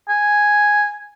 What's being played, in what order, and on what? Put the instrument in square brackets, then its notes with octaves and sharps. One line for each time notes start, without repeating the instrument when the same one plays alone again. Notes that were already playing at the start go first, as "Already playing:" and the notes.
[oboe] G#5